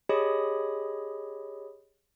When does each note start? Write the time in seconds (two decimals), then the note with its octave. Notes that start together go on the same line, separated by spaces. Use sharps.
0.09 G4 G#4 C#5 D#5 B5 D#6